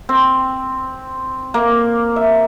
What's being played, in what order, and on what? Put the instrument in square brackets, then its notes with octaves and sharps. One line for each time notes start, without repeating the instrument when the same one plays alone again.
[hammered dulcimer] C4
A#3
E5